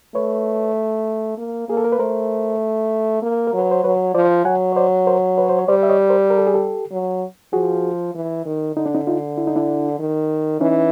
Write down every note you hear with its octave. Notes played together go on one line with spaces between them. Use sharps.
A3 B4 C#5
A#3
A#3 G#4
A4
A#4
B4
A3 A#4 C5
A#3
A#4
F#3
B4
C5
F#3 B4 C#5
F3 C5 D5
F#3 F#5 G#5
C#5
C5 D5
A#4 C5
B4 C#5
C5
C#5
G3 C5 D5
E5
C#5 D#5
A#4 C5
A#4
A4
G#4
G4 A4
F#3
F3 F#4 G#4
E3
D#3
D3 D#4
D4
C#4 D#4
D#4 F4
E4
D#4
D4 E4
D#3
E3 C#4 D#4